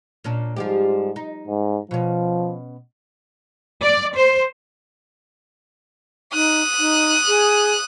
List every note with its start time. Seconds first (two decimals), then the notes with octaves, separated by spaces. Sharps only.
0.24 A#2 C#4 D4
0.56 G#2 F3 G3 G4
1.16 D#4
1.48 G#2
1.91 B2 F3 C#4
3.80 D5
4.15 C5
6.33 D#4 D#6 F#6
6.79 D#4
7.28 G#4